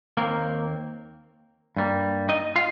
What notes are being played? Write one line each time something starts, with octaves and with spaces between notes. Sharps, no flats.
D#2 D#3 A#3 C4 A#4
G2 G3 A#3
D#4 D#5
F4 F5